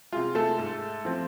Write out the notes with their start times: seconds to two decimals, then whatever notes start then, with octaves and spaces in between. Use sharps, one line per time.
0.12 C3 G#3 F4
0.35 A3 A4
0.58 G#2
1.05 F3 A3 C4